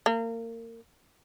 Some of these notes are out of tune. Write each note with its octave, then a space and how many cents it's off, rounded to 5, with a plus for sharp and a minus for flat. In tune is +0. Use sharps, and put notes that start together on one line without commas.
A#3 -30